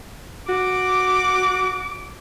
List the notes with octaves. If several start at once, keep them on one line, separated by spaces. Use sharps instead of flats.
F#4 D6